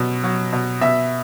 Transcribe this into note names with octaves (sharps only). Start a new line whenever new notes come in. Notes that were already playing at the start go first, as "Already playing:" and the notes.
Already playing: B2 F#3
F#3
B2
B2 E5